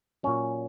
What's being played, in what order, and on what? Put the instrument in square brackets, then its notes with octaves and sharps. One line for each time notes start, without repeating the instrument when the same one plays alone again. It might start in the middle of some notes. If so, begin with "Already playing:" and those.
[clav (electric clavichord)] A#2 F#3 C#4